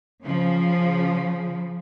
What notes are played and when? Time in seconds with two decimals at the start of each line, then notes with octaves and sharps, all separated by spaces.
0.25 C#3 F3